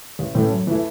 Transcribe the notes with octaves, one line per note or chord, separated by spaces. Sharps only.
A1
A2 E3 A3 C#4
F#2
E3 A3 E4